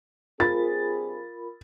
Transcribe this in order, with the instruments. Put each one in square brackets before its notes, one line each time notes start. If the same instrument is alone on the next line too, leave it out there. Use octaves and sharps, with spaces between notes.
[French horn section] G2 C4 G#4 [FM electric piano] F4 A#4 B5 [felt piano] A6